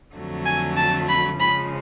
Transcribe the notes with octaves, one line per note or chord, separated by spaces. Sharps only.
F2 D3 F#3 A3
G#5
A5
B5
C#3 F3 G#3 B5